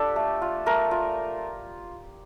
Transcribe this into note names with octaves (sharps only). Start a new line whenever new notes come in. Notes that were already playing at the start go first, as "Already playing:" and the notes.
Already playing: D4 F4 G4 A4
A3
F4
A3 A#4
F4